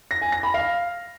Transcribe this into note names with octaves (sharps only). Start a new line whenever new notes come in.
A#6
G#5
A#6
B5
F5